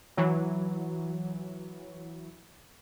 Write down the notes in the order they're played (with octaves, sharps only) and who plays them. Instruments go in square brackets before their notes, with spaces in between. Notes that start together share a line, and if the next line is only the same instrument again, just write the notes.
[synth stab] E3 F#3